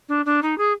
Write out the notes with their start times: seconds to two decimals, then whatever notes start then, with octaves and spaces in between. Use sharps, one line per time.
0.08 D4
0.25 D4
0.42 D#4
0.58 G#4